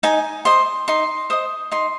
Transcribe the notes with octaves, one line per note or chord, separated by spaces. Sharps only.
D#4 G#5
C5 D#5 C6
D#4 C6
C5 D#5 D#6
D#4 C6